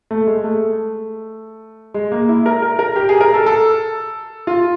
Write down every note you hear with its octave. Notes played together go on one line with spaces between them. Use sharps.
A3
G#3
A3
G#3
A#3
E4
A#4
A#4
A#4
G4
G#4
A#4
A4
A4
F4